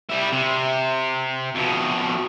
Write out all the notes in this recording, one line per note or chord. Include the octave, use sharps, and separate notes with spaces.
G3 E4
C3
F2 B2